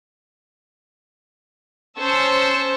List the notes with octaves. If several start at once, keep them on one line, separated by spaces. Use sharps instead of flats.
C#4 C5 A5 C#6 E6